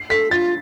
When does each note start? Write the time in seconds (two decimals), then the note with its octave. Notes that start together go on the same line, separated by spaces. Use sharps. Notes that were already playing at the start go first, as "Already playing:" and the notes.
Already playing: C7
0.10 A4 B6
0.31 F4 A6